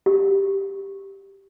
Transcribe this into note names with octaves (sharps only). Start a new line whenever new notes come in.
G4